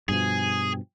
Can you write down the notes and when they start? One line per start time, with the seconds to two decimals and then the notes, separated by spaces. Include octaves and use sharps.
0.09 G2 B2 F3 G#4